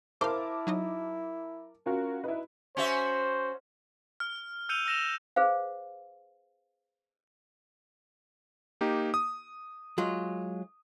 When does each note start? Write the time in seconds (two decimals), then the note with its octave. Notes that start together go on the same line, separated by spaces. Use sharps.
0.21 E4 A#4 C5 F5 A5 D6
0.67 F#3 D#4 D#5
1.86 C#4 F4 F#4 A#4
2.24 D#4 E4 B4
2.77 C#4 F#4 C5 E5
4.20 F6
4.69 E6 G6 C#7 D#7 F7 G7
4.86 E6 F6 A#6 E7 F7
5.36 G#4 B4 C5 F5
8.81 A#3 D#4 G4
9.14 D#6
9.98 F#3 G#3 F4